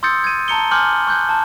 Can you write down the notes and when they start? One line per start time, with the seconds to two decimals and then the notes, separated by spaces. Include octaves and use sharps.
0.03 C6 D#6 E6 G6 A6 C#7
0.24 G#6 D#7
0.48 A5 A#5 C#7 G7
0.71 G#5 C6 D6 F6 G6 F#7
1.07 C#6 F#6 G6
1.29 A5